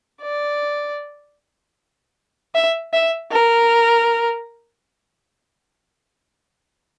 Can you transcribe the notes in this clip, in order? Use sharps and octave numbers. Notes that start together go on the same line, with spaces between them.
D5
E5
E5
A#4